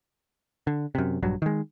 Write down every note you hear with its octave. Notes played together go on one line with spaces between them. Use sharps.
D3
F#2 C3
A#1 G2 F#3
D#3 G#3